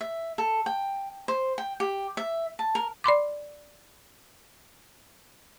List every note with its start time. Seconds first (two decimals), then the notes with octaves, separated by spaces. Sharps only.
0.01 E5
0.38 A4
0.66 G5
1.28 C5
1.58 G5
1.80 G4
2.17 E5
2.59 A5
2.75 A#4
3.04 D5 B5 C6 D6